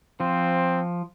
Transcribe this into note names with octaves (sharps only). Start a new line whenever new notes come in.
F3 C4